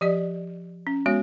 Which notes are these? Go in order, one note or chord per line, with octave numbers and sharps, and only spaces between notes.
F3 G4 D5 D#5
C#4
G#3 B3 F#4 C#5